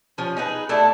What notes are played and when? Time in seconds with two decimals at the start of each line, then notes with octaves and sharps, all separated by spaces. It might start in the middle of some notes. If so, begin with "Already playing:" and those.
0.18 F3 C#4
0.37 D#4 G#4 B4
0.69 A3 D4 E4 A4